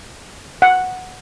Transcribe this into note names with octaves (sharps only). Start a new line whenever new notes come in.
F#5